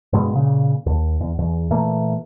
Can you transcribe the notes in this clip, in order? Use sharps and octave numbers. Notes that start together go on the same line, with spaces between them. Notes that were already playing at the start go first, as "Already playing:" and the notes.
G2 B2 G#3
A#2 C#3
D#2
E2
E2
A#2 E3 A3 A#3